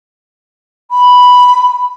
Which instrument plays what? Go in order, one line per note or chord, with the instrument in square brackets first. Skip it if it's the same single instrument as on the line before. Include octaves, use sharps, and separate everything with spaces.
[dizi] B5